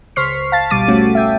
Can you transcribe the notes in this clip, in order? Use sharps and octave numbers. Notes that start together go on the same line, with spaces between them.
C#2 C5 C#6 F6 B6 C7
F5 A5 A6
G#1 B2 G3 D6 A6 D#7
A3 C#4 F#4
E5 G5